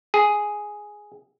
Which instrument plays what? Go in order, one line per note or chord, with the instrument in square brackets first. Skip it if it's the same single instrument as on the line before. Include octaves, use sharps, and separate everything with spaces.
[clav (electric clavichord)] G#4